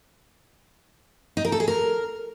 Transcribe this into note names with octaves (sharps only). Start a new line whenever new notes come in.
D#4
A#4
A4
G#4
A#4